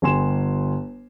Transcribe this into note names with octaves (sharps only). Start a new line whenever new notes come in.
G1 G4 G#5 C6 E7